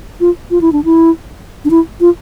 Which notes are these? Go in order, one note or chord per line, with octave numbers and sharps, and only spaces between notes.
F4
F4
E4
D4
E4
D4
E4
F4